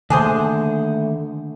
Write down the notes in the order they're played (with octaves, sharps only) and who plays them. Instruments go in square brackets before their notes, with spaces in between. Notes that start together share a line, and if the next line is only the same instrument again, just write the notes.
[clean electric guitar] D#2 A3 [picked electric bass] D3 [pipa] D4 G#4 C5